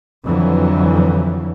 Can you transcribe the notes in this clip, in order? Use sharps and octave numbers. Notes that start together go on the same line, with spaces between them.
F2 D3 E3 F#3